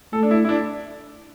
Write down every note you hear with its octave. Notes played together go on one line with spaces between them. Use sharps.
A3 A4
D4
E4
E4
D4